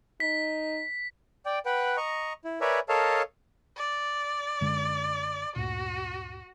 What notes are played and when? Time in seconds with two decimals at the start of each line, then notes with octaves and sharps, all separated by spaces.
0.20 D#4 B6
1.46 D5 G5
1.66 B4 F#5 G5
1.97 D#5 A#5 C#6
2.45 E4
2.61 A#4 B4 C#5 D5 E5 G#5
2.89 A4 A#4 C#5 D#5 F5 A5
3.77 D5
4.61 F#2 D3 G#3
5.56 D2 G2 A#2 F#4